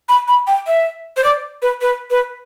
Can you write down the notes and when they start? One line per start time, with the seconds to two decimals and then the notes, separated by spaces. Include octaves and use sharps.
0.09 B5
0.28 B5
0.47 G5
0.67 E5
1.17 C5
1.24 D5
1.62 B4
1.81 B4
2.11 B4